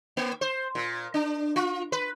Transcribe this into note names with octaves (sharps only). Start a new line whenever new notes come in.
A#3
C5
A#2
D4
F4
B4